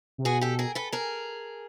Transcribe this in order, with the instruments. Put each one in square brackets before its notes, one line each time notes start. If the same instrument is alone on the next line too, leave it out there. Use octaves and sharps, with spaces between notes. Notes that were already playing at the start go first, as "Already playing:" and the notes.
[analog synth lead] C3
[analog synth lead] B2 [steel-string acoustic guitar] F#4 G#4
[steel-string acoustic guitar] G4 A4
G#4 A#4
A4 B4
G#4 A#4